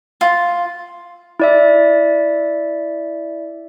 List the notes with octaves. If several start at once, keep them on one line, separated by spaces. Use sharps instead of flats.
F4
E4 D5 E5